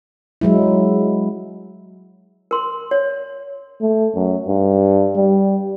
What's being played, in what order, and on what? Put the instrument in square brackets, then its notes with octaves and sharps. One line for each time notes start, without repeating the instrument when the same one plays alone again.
[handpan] F#3 G#3 E4
[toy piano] A#4 C6
C#5
[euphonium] A3
F#2
G2
G3